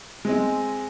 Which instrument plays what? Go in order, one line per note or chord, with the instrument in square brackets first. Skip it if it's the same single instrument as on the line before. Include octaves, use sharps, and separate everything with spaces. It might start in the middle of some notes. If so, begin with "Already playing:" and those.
[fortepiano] G#3 C4 D#5